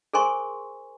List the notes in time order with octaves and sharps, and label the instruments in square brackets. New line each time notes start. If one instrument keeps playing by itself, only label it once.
[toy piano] G#4 A#4 C5 G#5 C6 C#6